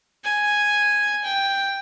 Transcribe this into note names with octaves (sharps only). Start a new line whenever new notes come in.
G#5
G5